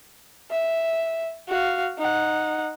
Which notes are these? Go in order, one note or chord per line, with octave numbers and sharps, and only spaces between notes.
E5
F#4 F5
D#4 F#5